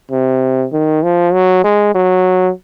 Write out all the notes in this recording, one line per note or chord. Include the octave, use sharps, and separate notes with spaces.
C3
D#3
F3
F#3
G#3
F#3